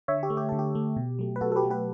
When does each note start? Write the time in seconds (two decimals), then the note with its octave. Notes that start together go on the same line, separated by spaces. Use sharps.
0.08 D3 C#5 E5
0.23 G4
0.30 A3
0.37 G4
0.49 D3 A4
0.59 G4
0.75 A3
0.97 B2
1.19 F#3 A3
1.36 B4
1.41 B2 F#4 A4
1.52 A4
1.56 G4 B4
1.63 F#3 A3
1.70 G4 B4